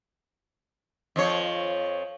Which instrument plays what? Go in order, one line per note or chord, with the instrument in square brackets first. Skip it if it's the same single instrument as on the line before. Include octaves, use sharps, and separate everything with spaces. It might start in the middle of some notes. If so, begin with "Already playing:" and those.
[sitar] F2 F3 C#5